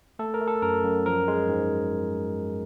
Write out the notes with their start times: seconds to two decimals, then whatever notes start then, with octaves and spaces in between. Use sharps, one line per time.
0.19 A3 A4
0.34 A#4
0.41 A3
0.48 A4
0.62 F#2 A#4
0.84 F#2
1.06 F3 A#4
1.28 G#3
1.49 G#2